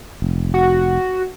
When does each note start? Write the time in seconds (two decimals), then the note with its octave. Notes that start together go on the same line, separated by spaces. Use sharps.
0.22 F1
0.54 F#4